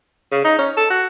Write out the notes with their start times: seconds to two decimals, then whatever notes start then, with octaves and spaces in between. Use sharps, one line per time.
0.32 C#3
0.45 D#4
0.59 C#4
0.77 A4
0.90 F#4